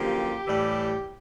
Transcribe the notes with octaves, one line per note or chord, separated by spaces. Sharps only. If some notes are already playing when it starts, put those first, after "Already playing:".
Already playing: F#2 D3 F3 A#3 G4
A2 E3 G3